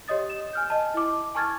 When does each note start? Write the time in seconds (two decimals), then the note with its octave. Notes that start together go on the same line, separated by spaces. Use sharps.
0.08 G4 C#5 D#5 D#6 A6
0.30 D#6 E7
0.53 G#5 F6 G6
0.70 D#5 A5
0.94 E4 D6
1.35 G#5 A5 C#6 F6 G#6 A6